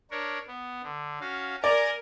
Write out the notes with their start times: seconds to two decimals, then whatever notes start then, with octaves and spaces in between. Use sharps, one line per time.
0.11 D4 A#4 C#5
0.47 B3
0.83 D3
1.20 C#4 F#4 F5
1.64 A#4 D5 G#5